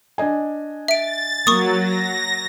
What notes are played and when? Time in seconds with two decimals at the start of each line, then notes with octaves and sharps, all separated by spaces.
0.18 D4 D#5 G#5
0.88 E5 A6 D7
1.47 F#3 A#3 C#6 D#6
1.78 A#6